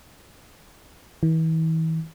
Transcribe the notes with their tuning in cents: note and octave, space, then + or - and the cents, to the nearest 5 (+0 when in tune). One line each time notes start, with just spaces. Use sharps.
E3 -40